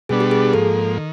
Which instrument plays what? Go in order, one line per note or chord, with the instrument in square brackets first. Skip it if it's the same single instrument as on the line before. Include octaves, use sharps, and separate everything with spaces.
[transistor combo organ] B2 G3 B3 D4 [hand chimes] G#4
[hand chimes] G4
G#4
[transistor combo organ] G#2 F3 A#3 [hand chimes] A4
[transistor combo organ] D#3